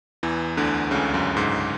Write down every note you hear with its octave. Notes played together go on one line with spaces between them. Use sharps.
E2 E3
D2 D3
C#2 C#3
F#2
G#2